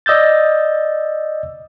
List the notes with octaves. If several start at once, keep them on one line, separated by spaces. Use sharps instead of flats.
D5 D#5 E6 G6 A6